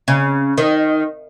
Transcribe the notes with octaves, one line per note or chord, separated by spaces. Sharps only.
C#3
D#3